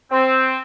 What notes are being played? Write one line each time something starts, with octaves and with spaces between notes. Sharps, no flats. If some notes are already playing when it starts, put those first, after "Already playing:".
C4